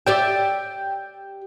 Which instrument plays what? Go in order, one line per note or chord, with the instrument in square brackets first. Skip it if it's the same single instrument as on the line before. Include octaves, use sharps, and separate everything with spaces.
[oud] G4 D5 E5 [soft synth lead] G5